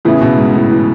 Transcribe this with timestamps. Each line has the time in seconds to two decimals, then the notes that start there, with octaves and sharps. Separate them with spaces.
0.05 A2 C#3 E3 B3 E4 G#4
0.22 B2
0.38 G#2
0.54 A2
0.70 E3